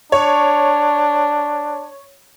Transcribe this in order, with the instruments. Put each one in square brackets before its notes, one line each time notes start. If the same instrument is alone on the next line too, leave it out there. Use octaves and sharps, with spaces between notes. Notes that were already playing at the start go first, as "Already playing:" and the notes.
[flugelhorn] D4 [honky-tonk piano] C#5